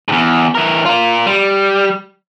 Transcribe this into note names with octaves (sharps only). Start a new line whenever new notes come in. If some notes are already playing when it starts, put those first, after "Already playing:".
E2 G#2
E3 A#4
F4 A#4
G3